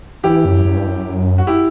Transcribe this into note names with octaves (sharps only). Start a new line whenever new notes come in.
E3 E4 G4
F#2
F#2
G2
F#2
F#4
E4 G4